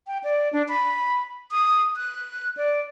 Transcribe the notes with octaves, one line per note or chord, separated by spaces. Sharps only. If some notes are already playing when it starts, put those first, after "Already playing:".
G5
D5
D4
B5
D#6
F#6
D5